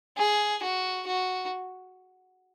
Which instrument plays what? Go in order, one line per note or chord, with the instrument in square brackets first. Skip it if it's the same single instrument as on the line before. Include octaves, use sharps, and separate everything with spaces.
[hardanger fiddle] G#4
F#4
F#4